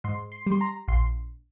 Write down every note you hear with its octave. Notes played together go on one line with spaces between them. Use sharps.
G#2 C6
C6
G3
C6
A#5
A#1 C6